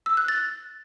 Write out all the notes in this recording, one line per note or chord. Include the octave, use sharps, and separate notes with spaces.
E6
F#6
A6